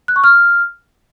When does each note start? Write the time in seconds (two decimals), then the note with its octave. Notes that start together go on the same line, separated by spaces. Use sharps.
0.08 F#6
0.16 C#6
0.24 F6